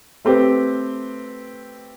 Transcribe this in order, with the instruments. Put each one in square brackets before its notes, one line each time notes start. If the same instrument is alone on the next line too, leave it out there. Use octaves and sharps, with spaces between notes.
[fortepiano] A3 C4 G4 B4